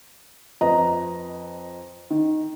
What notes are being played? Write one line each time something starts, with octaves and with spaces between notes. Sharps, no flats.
F2 B4 D#5 A#5
D#3